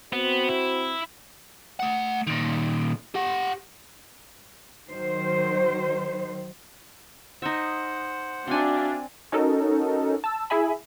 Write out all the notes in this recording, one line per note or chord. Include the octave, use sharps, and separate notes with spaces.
B3 C4 F#4 C5
E4
A3 F#5
A#2 D#3
G4 F#5
D#3 F#3 C5
D#4 C5 E5 F#5
C4 D4 F#4 E5 F5 G#5
C#4 D#4 F#4 A4 A#4
A5 E6
E4 G#4 E5 G#5 B5